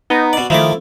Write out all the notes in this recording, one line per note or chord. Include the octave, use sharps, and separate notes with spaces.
B3 D#4
B2 D5
D#3 F3 A3 E4 D6